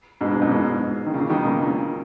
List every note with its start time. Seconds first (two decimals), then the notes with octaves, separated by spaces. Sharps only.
0.21 G#2 B2
0.32 G#2 B2
0.42 F#2 A#2
0.52 G#2 B2
1.06 D#3
1.14 A#2 C#3
1.30 B2 D#3
1.45 A#2 C#3
1.61 A#2 C#3